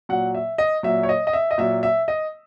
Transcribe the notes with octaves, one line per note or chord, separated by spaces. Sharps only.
A#2 F#3 F#5
E5
D#5
A#2 F#3 E5
C#5
D#5
D#5
E5
D#5
A#2 F#3 E5
E5
D#5